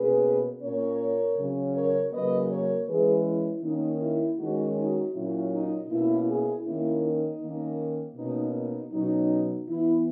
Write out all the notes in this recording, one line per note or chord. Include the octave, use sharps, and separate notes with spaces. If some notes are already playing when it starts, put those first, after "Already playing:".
Already playing: B2 A#3 C#4 G#4 B4
A#2 A#3 C#4 A#4 C#5
C#3 F#3 C#4
A#4 C#5
C#3 F#3 A#3 B4 D#5
A#4 C#5
E3 G#3 C#4 G#4 B4
E4
D#3 A#3 C#4 D#4
E4
D#3 G#3 C#4 D#4 F#4
D#4 F#4
A#2 F#3 C#4 E4
D#4
B2 A#3 C#4 E4
E4 G#4
D#3 A#3 C#4 E4
D#4
D#3 A#3 C#4
B2 A#3 C#4 D#4
D#4
B2 F#3 C#4 D#4
E3 B3 E4